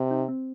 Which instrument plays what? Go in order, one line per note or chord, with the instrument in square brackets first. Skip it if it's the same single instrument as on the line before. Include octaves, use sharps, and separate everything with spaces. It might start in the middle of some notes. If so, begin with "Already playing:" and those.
Already playing: [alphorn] C3
[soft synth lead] D#4
C4